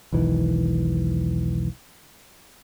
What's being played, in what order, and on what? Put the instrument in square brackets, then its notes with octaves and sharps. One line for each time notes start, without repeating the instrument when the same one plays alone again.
[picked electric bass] E1 B1 D#3 E3